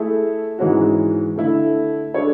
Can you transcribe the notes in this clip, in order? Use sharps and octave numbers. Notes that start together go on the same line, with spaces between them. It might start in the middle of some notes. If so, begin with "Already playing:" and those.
Already playing: A3 E4 G#4
G#2 E3 G#3 C#4 F#4
D3 A3 E4
G#3 D4 A4 C#5